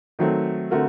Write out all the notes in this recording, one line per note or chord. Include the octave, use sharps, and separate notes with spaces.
D#3 F#3 A3 C4
D3 A3 C4 F#4 A#4